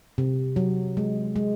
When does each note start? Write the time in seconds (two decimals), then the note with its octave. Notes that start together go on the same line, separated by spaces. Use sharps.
0.18 C3
0.56 F#3
0.97 G#3
1.36 G#3